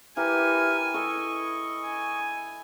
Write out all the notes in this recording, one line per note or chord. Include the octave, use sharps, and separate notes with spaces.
E3 G4 A#4 G#5
A4 D#5 C#6
G#5